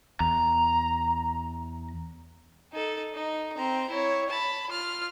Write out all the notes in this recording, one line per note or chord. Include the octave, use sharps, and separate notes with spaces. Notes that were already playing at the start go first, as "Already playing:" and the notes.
E2 A#5
D#4 A4
D#4
C4 A#5
E4 C#5
A5 B5
F4 F6